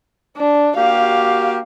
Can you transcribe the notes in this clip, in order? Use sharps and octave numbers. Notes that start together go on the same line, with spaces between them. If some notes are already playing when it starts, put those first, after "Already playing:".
D4
A#3 F#4 G4 F5